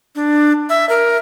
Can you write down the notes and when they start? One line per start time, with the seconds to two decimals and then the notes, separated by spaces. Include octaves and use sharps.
0.15 D4
0.70 E5
0.89 A#4